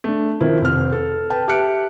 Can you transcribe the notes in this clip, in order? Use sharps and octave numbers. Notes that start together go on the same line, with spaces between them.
A3 D4
D#3 F3 C4 E4
F1 C4 F6
A4
B4 G5 A5
G4 E5 A5 F#6 C#7 D7